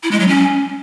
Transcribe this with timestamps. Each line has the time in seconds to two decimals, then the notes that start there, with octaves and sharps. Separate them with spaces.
0.03 E4
0.11 G#3
0.20 F#3
0.28 C#4